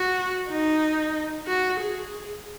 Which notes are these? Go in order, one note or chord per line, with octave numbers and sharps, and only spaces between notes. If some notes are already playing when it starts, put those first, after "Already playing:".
Already playing: F#4
D#4
F#4
G#4